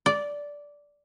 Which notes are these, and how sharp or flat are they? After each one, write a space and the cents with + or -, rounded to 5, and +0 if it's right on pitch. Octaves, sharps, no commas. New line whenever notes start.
D5 -10